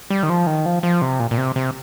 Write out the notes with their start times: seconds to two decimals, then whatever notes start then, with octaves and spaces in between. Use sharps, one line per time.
0.10 G3
0.23 D#3
0.29 F3
0.47 D#3
0.66 F3
0.83 F3
1.02 C3
1.20 A#2
1.31 A#2
1.38 C3
1.56 C3